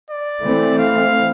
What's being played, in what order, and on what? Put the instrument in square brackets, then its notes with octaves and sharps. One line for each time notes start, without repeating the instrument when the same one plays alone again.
[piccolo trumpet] D5
[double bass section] E3 A3 C4
[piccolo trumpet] F5